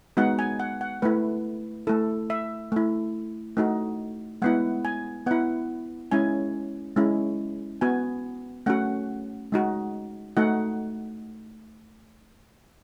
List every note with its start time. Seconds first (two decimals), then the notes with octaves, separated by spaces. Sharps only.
0.17 G#3 B3 D#4 F#4 F#5
0.39 G#5
0.60 F#5
0.81 F#5
1.02 A3 E4 B4
1.87 A3 E4 A4
2.30 E5
2.72 A3 E4
3.57 A3 D#4 F#4
4.42 G#3 B3 E4 F#5
4.85 G#5
5.26 B3 E4 F#5
6.11 G#3 C#4 E4 G#5
6.97 G#3 C#4 E4
7.81 B3 F#4 G#5
8.66 A3 C#4 F#4 F#5
9.52 G#3 D#4 F#4
10.37 A3 D#4 F#4 F#5